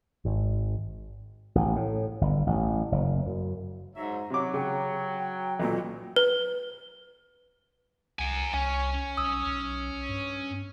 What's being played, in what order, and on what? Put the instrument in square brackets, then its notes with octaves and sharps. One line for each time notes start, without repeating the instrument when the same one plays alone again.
[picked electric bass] G#1
[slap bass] A1
A2
G1
A1
F#1
F#2
[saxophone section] G#2 F#3 E5 [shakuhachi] D#4
[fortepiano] C3 D6 [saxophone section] F#3
[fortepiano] C#3 [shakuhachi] G5
[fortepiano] B1 A#2 [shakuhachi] A4
[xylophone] B4
[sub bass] C2 [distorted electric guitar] F#5 G#5
[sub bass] C2 [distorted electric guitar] C#4 [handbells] G#5
[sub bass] B1 [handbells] D#6 E6
[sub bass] B1
G2